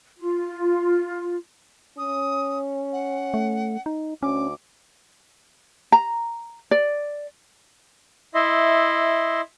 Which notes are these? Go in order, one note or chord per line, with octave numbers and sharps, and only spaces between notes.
F4
C#4 D#6
F#5
A3
D#4
D2 C#4 D6
A#5
D5
E4 D#5 E5 C6